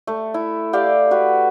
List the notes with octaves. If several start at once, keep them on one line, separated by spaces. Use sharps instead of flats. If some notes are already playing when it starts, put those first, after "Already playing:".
A3
E4
G4 D5 F5 G5
F#4 B4